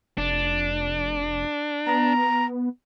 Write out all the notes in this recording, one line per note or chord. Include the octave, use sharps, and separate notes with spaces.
F1 D4
B3 A#5